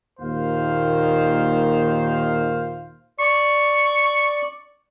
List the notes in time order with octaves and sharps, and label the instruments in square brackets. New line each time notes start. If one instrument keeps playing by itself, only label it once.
[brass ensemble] D#2 A#2 D#3 C5 F5
[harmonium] D5 [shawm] C#6